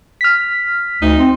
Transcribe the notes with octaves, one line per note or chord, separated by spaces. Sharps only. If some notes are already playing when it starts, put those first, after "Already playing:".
F6 B6
D2 D#4
C4